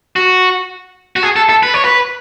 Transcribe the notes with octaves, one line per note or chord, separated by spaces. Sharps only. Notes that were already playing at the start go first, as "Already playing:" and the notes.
F#4
F#4
G#4
A4
A4
B4
C#5
B4